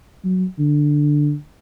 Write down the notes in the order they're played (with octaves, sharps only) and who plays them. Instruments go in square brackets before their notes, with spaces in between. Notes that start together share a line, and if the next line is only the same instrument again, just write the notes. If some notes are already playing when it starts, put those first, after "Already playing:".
[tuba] F#3
D3